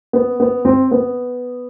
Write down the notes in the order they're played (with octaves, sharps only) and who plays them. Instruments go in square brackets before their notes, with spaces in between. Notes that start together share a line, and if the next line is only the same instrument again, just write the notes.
[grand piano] B3
B3
C4
B3